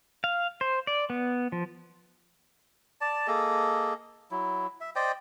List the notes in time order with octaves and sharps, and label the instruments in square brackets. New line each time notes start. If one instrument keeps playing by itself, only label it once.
[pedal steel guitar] F5
C5
D5
B3
F3
[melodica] D5 A5
A#3 G#4 A4 D#5
F#3 E4
E5
C5 D5 D#5 G5